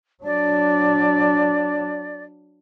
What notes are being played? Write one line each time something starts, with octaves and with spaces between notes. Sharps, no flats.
F#3 D4 D5